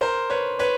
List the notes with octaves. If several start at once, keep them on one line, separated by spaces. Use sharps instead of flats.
A#4 C5
B4 C#5
B4 C#5